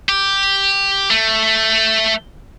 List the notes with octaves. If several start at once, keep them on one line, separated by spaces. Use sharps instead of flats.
G4
A3